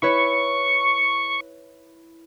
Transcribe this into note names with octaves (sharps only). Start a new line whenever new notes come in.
E4 B4 C#5 C#6